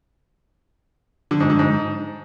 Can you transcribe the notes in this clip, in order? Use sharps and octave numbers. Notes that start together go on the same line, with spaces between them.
D3
G#2
D3
G#2